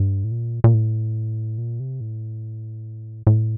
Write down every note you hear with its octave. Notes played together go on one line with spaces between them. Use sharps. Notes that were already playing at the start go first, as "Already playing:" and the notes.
Already playing: G2
A2
A#2
A#2
A2
A#2
C3
A2
A2